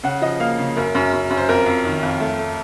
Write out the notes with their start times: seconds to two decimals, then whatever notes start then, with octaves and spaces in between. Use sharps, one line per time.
0.03 C#3 F#5
0.21 F3 D#5
0.40 A#3 F5
0.59 C#3
0.76 F#2 A#4
0.95 F#2
1.13 F#2
1.30 F#2
1.37 C5
1.49 F2 A#4
1.66 F2
1.85 D#3
2.03 F2
2.20 A3
2.39 A3